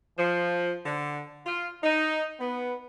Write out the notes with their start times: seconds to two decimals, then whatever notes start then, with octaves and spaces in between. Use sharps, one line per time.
0.18 F3
0.86 D3
1.45 F4
1.83 D#4
2.40 B3